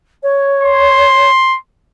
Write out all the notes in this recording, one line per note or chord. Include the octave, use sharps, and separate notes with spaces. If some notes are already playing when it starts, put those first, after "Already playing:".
C#5
C6